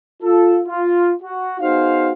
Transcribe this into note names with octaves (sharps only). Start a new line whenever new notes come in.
F4 A4
F4
F#4
B3 D#4 F#4 G#4 C5 F5